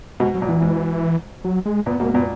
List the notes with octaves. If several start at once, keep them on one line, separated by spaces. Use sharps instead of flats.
G#2 B2
F#3
A#2
E3
G#2
F#3
G#3
A#2 B3
G#2 B2 A#3
A#2 B3